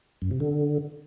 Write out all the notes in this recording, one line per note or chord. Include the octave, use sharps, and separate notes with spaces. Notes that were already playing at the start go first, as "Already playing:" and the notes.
F#2
C3
D3